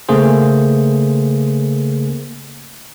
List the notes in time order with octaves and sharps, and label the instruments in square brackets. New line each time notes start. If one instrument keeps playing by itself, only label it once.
[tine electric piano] C#3 A3 A#3 G#4 C5